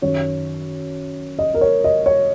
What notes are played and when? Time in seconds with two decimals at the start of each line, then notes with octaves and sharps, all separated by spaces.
0.02 F#2 D#3 C#5
1.39 D#5
1.54 A#4
1.61 C#5
1.84 D#5
2.06 C#5